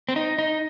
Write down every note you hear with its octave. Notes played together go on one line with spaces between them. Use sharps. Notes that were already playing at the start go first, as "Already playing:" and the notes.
C4
D#4
D#4